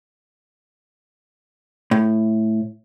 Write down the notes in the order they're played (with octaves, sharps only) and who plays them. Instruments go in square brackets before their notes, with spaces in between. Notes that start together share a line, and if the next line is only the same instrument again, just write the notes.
[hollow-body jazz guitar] A2